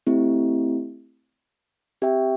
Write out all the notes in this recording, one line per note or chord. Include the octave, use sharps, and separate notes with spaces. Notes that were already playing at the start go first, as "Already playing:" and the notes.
A3 C4 E4 G4
C4 G4 E5 G5